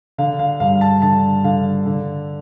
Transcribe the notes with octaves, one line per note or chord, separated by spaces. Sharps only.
D3 F5
F5
G2 F5
A5
D3 A5
D3 F5
D3